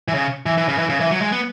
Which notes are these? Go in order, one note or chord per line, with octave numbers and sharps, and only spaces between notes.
E3
C#3
E3
E3
C#3
E3
C#3
E3
F#3
G#3
B3